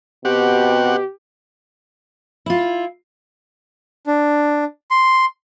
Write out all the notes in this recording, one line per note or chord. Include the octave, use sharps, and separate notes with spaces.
B2 C4 F#4 G4 F#5
E4 F4
D4
C6